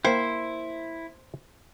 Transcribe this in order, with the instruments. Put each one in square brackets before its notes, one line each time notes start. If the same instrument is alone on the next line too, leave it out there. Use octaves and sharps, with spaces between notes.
[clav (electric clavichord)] A#3 G5 [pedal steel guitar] E4 [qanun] C5